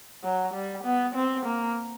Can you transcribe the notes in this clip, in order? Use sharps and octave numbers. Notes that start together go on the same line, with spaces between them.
F#3
G3
B3
C4
A#3